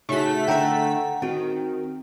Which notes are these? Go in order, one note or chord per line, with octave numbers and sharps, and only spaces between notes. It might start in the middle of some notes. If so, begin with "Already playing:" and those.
C#3 A3 D#4 F#4 B6
D3 E5 F#5 G5 A#5
D#3 C4 F#4 G5